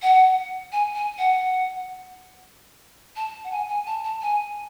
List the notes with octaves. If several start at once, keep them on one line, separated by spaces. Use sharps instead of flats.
F#5
G#5
G#5
F#5
A5
F#5
G#5
G#5
A5
A5
G#5